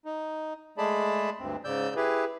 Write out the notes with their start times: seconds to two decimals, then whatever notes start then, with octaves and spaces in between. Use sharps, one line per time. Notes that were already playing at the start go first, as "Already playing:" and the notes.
0.05 D#4
0.78 G#3 A3 G#4 D5 A5 B5
1.40 D2 G2 C4
1.65 G#2 C#3 D5 E6 G6
1.96 E4 G4 G#4 B4